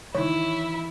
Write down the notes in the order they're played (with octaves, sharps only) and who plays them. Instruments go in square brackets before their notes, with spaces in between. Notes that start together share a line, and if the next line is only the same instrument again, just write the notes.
[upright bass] D#3 E3 [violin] E4 [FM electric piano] C#5